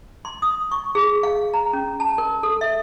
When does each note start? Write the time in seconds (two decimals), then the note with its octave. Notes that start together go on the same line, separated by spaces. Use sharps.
0.25 C6
0.42 D#6
0.71 C#6
0.95 G#4
1.23 F5
1.54 A#5
1.73 C#4
2.00 A5
2.18 A#4
2.43 A4
2.61 E5